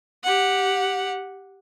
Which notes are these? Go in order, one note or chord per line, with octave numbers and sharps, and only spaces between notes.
G4 F#5